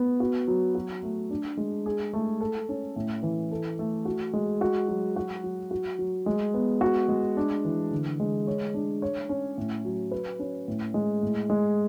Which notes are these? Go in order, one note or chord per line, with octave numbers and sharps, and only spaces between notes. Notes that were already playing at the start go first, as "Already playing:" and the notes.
Already playing: B3
F#4
F#3
F#4
A3
D4
G#3
G#4
A3
A4
C#4
A2
E3
A4
A3
F#4
G#3
F#4
F#3
F#4
F#3
F#4
F#3
G#3
B3
F#4
G#3
D4
E3
D3
G#3
C#5
D4
C#5
C#4
A2
F#3
B4
C#4
A2
G#3
A2
G#3